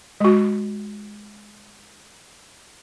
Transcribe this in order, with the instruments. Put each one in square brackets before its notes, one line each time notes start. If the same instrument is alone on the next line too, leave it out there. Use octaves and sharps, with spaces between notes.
[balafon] G#3 F#4